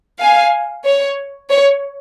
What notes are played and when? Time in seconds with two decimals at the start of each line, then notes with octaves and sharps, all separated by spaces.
0.20 F5 G#5
0.85 C#5
1.50 C#5